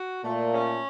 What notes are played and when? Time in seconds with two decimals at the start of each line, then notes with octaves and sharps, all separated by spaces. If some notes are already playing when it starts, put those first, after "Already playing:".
Already playing: F#4
0.24 A#2 A3
0.54 C#4